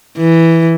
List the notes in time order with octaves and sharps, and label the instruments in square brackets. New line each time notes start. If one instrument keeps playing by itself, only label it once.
[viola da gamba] E3